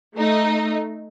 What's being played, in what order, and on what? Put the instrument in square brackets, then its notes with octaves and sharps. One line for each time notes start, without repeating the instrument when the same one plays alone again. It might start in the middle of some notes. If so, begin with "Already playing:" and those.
[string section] A3 D#4